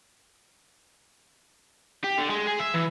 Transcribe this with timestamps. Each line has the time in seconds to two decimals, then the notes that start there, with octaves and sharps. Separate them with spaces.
2.04 G4
2.18 D3
2.30 G#3
2.47 G#4
2.60 E5
2.74 E3